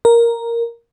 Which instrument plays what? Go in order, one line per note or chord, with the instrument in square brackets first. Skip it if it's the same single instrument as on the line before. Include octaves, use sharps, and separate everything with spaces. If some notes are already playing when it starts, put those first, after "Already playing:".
[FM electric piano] A#4